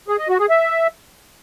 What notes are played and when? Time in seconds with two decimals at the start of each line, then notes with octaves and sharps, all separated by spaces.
0.08 G#4
0.19 D#5
0.29 F#4
0.39 G#4
0.50 E5